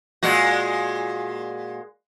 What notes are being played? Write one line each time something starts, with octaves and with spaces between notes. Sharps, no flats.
A#2 G#3 F#4